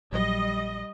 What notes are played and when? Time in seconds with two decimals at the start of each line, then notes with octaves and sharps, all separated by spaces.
0.13 A#1 F#3 G3 D#5